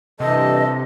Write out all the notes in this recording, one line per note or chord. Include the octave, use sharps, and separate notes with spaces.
G2 C3 E3 A4 D#5